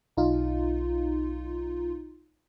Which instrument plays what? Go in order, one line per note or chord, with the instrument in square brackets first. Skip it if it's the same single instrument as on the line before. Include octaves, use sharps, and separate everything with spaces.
[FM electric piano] B1 D#4 F4